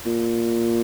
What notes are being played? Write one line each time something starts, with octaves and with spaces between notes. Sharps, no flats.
A#2